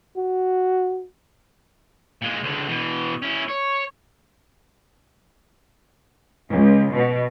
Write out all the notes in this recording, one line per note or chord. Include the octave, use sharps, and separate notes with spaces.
F#4
A#2 G#3
C#2 D3
B2 E3
C#4 E4
C#5
C#2
B2